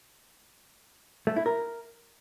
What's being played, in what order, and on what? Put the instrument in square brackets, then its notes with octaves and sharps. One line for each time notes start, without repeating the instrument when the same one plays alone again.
[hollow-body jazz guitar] A3
E4
A#4